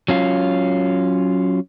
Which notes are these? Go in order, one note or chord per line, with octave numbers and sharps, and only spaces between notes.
F#3 C#4 F4